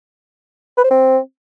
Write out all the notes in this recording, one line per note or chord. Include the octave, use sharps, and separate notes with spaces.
B4
C5
C4